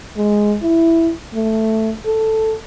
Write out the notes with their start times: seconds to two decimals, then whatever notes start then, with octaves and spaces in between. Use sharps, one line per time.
0.17 G#3
0.62 E4
1.35 A3
2.05 A4